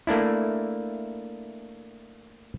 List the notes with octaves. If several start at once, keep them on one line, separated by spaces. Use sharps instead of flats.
A3 A#3 D4 E4